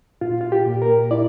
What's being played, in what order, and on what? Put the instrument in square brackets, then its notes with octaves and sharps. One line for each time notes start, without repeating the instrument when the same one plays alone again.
[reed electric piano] A#2 F4
F4
G4
A#2
A#4
E4 D5